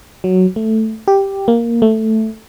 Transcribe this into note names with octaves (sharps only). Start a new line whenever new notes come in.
F#3
A3
G4
A#3
A3